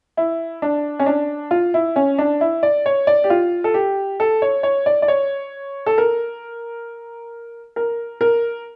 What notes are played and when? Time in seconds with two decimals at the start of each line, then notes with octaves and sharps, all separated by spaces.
0.17 E4
0.62 D4
0.99 C#4
1.06 D4
1.51 F4
1.74 E4
1.96 C#4
2.18 D4
2.41 E4
2.63 D5
2.86 C#5
3.07 D5
3.24 G4
3.30 F4
3.64 A4
3.74 G4
4.20 A4
4.42 C#5
4.63 C#5
4.86 D5
5.02 D5
5.08 C#5
5.86 A4
5.98 A#4
7.76 A#4
8.21 A#4